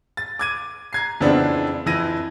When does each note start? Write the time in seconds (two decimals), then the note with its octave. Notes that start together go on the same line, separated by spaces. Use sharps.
0.17 A6
0.39 D6 G#6 D#7
0.93 A#5 G#6 C7
1.21 F2 C#3 E3 B3 C4 D4
1.86 F2 E3 A#6 D#7